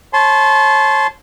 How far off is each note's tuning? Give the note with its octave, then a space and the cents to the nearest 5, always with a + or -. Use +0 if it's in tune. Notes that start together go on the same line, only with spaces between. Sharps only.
C#5 -30 A5 -25 C6 -20